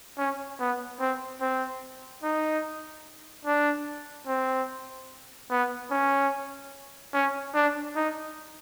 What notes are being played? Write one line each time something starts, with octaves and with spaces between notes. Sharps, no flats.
C#4
B3
C4
C4
D#4
D4
C4
B3
C#4
C#4
D4
D#4